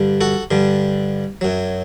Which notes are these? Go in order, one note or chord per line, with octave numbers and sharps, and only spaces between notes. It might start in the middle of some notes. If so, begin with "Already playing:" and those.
Already playing: G2 D3 G3
F#4 A4
G2 D3 G3
F#2 F#3